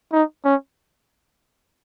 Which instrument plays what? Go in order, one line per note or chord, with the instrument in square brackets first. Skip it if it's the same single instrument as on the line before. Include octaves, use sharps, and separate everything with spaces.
[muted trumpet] D#4
C#4